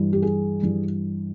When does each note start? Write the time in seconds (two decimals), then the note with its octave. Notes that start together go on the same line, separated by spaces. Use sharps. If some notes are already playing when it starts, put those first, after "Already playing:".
Already playing: G2 E3 G3
0.13 G4
0.22 G#4
0.63 G2 E3 G3